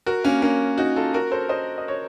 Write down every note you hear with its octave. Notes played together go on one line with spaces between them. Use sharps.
F#4 A#4
A#3 C#4
A#3 C#4
D#4 F#4
F4 A4
F#4 A#4
A4 C5
C5 D#5
D#5
C#5